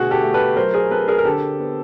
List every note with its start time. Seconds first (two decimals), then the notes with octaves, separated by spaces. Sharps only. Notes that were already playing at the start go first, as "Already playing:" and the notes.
Already playing: B2 D3 A3 F#4 G#4
0.10 G4 A4
0.23 A3
0.34 A4 B4
0.56 F#3 A#4 C5
0.74 G#4 A#4
0.91 C4 A4 B4
1.08 G#4 A#4
1.18 A#4
1.25 D3 G4 A4
1.59 B3